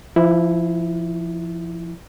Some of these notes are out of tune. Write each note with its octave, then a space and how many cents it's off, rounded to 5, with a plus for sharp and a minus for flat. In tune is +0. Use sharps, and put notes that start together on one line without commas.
F3 -25 E4 +0